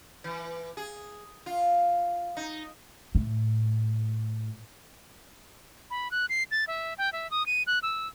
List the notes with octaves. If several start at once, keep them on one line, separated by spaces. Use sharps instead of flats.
E3
G#4
F4
D#4
A2
B5
F#6
C7
A6
E5
G5
E5
D#6
D#7
F#6
E6